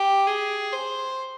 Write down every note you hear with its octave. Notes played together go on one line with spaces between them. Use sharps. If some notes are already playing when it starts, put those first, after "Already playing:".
Already playing: G4
G#4
C5